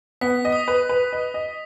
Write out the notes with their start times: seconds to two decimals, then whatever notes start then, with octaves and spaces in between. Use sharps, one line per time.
0.21 B3 B6
0.45 D#5
0.52 D#6
0.68 B4
0.89 B4
1.13 D#5
1.34 D#5